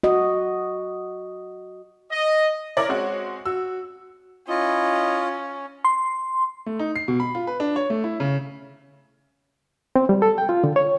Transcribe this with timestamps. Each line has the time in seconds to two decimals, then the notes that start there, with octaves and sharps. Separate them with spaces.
0.04 F#4 D#5
2.10 D#5
2.77 E4 A#4 C#5 D5
2.89 G#3 C4 F#4
3.46 F#4 E6
4.49 C#4 E4 F4 D#5
5.85 C6
6.66 A3
6.79 D#4
6.96 C7
7.08 B2
7.20 B5
7.35 F4
7.47 B4
7.60 D4
7.76 C#5
7.90 A3
8.04 E4
8.20 C#3
9.96 C4
10.09 G3
10.22 A4
10.38 G5
10.49 F4
10.64 D3
10.76 C#5